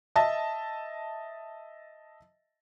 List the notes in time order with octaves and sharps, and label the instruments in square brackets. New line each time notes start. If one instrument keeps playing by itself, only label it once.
[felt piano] D#5 E5 A5